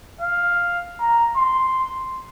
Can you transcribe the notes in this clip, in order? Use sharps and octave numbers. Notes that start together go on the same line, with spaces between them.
F5
A#5
C6